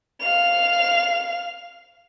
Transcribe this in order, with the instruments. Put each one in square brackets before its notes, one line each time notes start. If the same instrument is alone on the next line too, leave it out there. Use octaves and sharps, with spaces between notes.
[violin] F5 F7